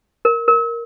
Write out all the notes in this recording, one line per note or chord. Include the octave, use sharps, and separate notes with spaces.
A#4
A#4